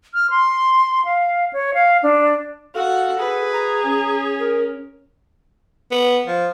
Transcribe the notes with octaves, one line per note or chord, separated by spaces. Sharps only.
F6
C6
F5
C#5
F5
D4
F#4 A4 F5 F#5
G#4 B4
A#5
C#4
A#4
B3
F3